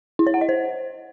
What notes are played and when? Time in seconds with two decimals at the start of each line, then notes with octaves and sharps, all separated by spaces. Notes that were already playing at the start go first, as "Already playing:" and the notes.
0.19 E4
0.27 C#5
0.34 F#5
0.41 D#5
0.49 C5